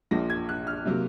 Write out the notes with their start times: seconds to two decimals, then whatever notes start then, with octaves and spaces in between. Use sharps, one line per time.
0.11 A#1 A#2 F3 A#6
0.30 G#6
0.49 F#6
0.67 F6
0.85 C3 F#3 A#3